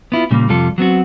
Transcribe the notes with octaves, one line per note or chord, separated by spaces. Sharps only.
B3 E4 F4
A#2 C#3 G3 A#3
F2 C3 G3 F4 A4
F#3 B3 C4 F#4